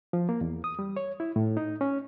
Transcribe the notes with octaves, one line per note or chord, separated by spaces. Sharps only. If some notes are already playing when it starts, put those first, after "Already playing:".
F3
A#3
E2
D#6
G3
C#5
E4
A2
D#4
C#4